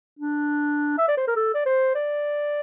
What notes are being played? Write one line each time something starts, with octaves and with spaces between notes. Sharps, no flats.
D4
E5
D5
C5
A#4
A4
D5
C5
D5